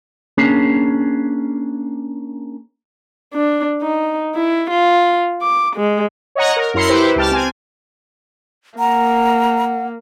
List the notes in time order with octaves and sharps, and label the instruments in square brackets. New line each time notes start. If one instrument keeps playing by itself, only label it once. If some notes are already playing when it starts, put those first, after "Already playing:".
[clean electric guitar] A#3 C#4 D4 G#4
[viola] D4
D#4
E4
F4
D6
G#3
[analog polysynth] C#5 D#5 F#5 A#5
A#4
F#2 E4 A#4 C6 C#7
E4 G4 B4 C5
C#2 G4 A5 F6
C4 G#5
[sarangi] A#3 [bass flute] F#5 [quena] A#5